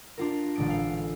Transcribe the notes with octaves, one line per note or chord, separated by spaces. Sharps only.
D4 F4 A#4
A1 A#2 D3 G#3 A6 D7
A4 F5